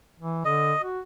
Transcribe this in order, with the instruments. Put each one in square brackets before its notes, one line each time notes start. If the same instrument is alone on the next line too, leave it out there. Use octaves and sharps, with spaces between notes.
[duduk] E3
[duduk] D3 [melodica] D#5
[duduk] F#4